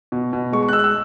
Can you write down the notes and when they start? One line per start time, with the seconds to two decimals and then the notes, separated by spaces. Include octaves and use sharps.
0.12 B2
0.33 B2
0.52 G#3 C#6
0.63 C#6
0.69 F#6
0.73 G#3 E6
0.79 F#6
0.84 E6